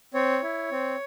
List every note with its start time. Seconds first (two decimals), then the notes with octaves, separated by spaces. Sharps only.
0.14 C4 C#5
0.43 E4
0.72 C4